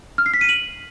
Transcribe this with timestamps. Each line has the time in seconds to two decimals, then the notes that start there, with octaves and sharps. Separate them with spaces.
0.18 F6
0.26 C7
0.34 B6
0.41 D#7
0.49 F#7